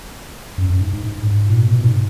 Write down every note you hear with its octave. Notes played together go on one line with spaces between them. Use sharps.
F#2
F#2
G#2
G#2
G#2
G#2
A#2
B2
B2
G#2